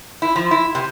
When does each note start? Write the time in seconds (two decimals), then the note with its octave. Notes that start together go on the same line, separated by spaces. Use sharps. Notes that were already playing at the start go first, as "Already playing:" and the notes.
0.22 E4
0.36 F3
0.51 E4
0.75 C3